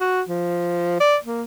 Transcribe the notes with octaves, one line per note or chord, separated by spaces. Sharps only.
F#4
F3
D5
A#3